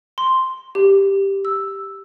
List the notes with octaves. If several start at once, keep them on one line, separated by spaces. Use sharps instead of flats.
C6
G4
E6